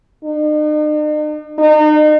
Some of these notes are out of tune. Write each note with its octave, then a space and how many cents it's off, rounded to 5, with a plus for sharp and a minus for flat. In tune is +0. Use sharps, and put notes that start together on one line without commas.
D#4 -45
D#4 -35